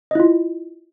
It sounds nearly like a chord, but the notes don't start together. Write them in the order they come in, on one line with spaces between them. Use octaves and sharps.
D#5 E4 F4